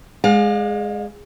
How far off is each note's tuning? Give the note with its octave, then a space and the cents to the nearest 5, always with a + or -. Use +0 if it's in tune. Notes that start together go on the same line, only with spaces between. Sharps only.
G#3 +0 D5 +45 F5 +30